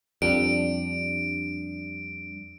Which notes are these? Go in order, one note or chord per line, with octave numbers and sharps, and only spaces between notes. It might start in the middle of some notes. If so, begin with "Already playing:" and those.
F2 G3 D4 D7